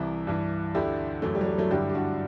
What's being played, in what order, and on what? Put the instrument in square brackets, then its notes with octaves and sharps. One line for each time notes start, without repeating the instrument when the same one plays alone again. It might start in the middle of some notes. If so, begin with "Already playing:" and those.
Already playing: [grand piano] C2 C3 E3 E4
G2 E3
D2 D3 E4 G4
F#2 E3 F#3 A3
G3
F#3
G3
F#3 A3
G2 D3 E4 G4
G4
D4 F#4